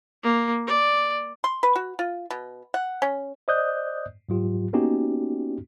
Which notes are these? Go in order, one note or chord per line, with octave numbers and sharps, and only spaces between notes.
A#3
D5
C6
B4
F#4
F4
B2
F#5
C#4
C5 D5 D#5 D#6 F#6 G6
G#2 F#3 F4 G4
A#3 B3 C#4 D#4 F#4 G4